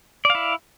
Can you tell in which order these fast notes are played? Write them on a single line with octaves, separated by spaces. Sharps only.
D5 F5 E4